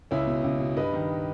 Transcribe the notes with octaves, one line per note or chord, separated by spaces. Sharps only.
C#2 C#4 E4
B2
C#2
B2
G2 B4 D#5
D#3